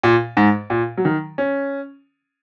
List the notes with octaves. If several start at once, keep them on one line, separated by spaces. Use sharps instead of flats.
A#2
G#2
A#2
F#3
D#3
C#4